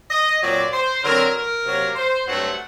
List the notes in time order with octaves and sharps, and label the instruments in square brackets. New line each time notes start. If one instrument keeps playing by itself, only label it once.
[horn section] D#5
A#2 F#3 C4 D5
C5
D3 F#3 C4 A#4
A#4
C3 F#3 A#3
C5
G2 F#3 A3 C4 F#5